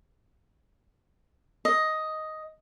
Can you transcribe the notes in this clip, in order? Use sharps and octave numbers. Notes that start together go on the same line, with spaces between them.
D#5